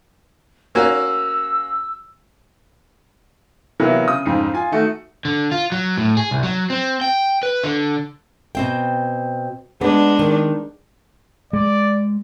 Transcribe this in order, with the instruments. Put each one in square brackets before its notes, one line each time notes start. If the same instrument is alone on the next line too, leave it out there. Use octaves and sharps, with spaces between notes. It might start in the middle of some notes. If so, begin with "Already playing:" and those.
[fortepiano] A#3 C#4 F#4 [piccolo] E6
[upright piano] C3 E3 F#3 A#3 B3
C#3 D#6
F2 G#2 C#3
F4 G#5
D#3 A3 F#4
[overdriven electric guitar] D3
F4
F#3
A2
G#4
C2
F#3
C4
G5
B4
D3
[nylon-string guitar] B2 C4 G5
[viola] G#3 D4 [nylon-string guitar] B3
[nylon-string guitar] D#3
[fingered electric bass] G#3 [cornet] D5